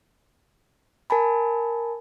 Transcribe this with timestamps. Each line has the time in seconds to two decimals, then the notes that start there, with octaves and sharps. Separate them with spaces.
1.10 A#4 G#5 A5 B5